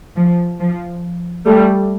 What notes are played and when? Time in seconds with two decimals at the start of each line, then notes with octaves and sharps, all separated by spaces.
0.16 F3
0.59 F3
1.46 G3 A3